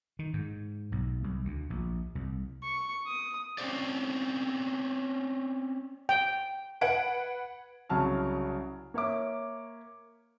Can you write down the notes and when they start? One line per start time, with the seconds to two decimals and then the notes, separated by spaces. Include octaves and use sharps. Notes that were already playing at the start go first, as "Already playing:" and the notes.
0.19 D#3
0.33 G#2
0.92 B1
1.24 C2
1.45 D2
1.70 A#1
2.15 C2
2.63 C#6
3.07 D#6
3.58 C4 C#4 C5 D5
6.09 G5
6.81 B4 F#5 G#6 D7
7.90 C2 C#3 F#3 A5 F6
8.94 A#3 C#5 E5 D6